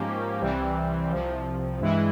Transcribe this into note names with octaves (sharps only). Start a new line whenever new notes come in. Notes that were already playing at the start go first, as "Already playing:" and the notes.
Already playing: G#2 F3 A#3 C#4 G4
C2 C3 E3 G3 C4
C2 C3 F3
G2 E3 G#3 E4